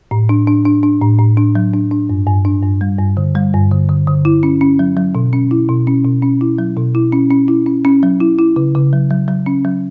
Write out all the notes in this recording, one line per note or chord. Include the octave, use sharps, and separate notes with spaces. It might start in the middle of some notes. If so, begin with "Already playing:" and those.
A2
D4
D4
D4
D4
A2
A2
D4
F#3
D4
D4
G2
G2
D4
G2
G3
G2
D3
G3
G2
D3
D3
D3
E4
C#4
C#4
F#3
F#3
B2
C#4
E4
B2
C#4
B2
C#4
E4
F#3
B2
E4
C#4
C#4
E4
C#4
C#4
F#3
E4
E4
C#3
C#3
F#3
F#3
F#3
C#4
F#3